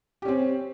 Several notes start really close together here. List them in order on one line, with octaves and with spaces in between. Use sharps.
G4 C#4 C4